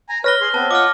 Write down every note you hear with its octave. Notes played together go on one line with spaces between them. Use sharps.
G#5 A#5
B4 C#5 F6 A#6 G7
G#4 C6
B3 C4 B4 A5
F4 D#5 F#5 D6 F6